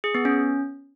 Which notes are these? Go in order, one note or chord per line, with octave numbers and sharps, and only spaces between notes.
G#4
B3
C#4